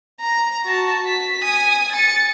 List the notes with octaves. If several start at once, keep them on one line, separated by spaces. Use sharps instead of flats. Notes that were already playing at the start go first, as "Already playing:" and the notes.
A#5
F#4 A5
B6
G#5 D#6
A6 C#7